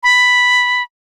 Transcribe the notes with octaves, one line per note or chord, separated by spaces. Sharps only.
B5